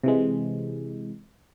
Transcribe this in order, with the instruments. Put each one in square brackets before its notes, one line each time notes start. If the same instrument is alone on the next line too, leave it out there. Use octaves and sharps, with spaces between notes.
[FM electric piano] C3 E3 G#3